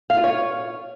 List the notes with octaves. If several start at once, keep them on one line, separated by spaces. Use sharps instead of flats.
F5
F4
C#5